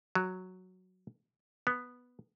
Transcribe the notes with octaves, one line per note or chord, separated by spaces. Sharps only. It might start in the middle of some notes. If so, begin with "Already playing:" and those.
F#3
B3